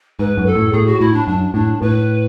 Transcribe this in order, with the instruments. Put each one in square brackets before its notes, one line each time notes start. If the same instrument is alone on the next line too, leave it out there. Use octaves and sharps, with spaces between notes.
[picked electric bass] G#2 [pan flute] B4
[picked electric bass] F#2
[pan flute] A4
[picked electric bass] A2
[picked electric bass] A2 [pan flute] G#4
[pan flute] F#4
[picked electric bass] A2 [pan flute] E4
[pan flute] D4
[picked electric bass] F#2 [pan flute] D4
[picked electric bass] A2 [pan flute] D4
[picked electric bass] A2 [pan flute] B4